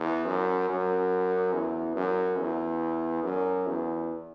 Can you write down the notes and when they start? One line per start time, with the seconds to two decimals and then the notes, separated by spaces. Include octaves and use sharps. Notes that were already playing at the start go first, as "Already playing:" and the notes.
Already playing: E2
0.25 F#2
0.69 F#2
1.53 E2
1.96 F#2
2.39 E2
3.24 F#2
3.67 E2